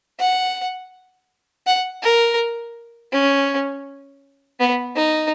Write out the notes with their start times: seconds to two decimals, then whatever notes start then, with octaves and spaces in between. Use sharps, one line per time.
0.20 F#5
1.67 F#5
2.03 A#4
3.12 C#4
4.60 B3
4.96 D#4